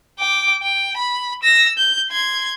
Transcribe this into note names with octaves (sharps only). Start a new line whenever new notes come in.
G5 D6
G5
B5
E6 A#6
G6
C6 G#6